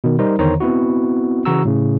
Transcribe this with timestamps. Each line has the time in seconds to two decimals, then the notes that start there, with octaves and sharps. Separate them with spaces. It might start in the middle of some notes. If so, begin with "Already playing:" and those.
0.04 B2 D#3
0.19 G3 D#4 A#4 C5
0.39 E2 D3 D#3 C5 C#5 A#5
0.60 B3 C4 E4 F#4
1.45 C#3 E3 F#4 A#5 E6
1.65 A2 C#3